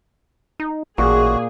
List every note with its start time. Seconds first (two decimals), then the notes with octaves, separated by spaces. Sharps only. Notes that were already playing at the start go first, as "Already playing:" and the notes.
0.60 D#4
0.98 A1 A#2 F#4 G#4